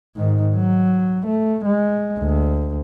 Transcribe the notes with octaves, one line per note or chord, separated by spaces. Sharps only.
G#2 D#3
F#3
A3
G#3
D2